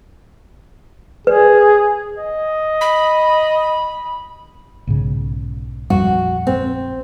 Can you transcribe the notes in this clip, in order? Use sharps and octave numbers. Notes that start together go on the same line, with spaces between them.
G#4 B4 D5
D#5
B5
B1 G#2 C#3
A#1 F2 G3 F#4
C4